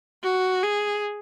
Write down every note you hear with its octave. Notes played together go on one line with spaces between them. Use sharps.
F#4
G#4